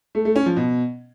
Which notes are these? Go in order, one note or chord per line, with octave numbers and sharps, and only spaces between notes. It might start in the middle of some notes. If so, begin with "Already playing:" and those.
A3
A3
C#4
F3
B2